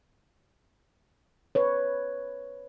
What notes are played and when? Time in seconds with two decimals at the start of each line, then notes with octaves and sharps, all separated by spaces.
1.55 B4 C#5